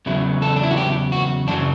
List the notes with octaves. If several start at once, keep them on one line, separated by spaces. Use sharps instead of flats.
E2 C#3 F#3 E4
A4
D4
E4
F#4
G4
F#4
F#2 C#3 F#3 D4